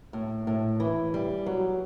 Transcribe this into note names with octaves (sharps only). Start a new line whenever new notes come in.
A2
A2
E3
G3
F#3